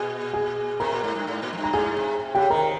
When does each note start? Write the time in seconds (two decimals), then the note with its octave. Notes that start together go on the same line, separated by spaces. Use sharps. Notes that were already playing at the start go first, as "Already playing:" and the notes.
Already playing: A#2 G#4 G#5
0.34 G#4 G#5
0.80 C3 A#4 A#5
0.92 A#2
1.03 G#2
1.15 G2
1.27 G#2
1.42 A#2
1.53 F2
1.57 G2
1.64 A#5
1.73 G#2 G#4 G#5
1.96 C3
2.20 C3
2.35 C#3 G4 G5
2.50 C3 D#3 A#4 A#5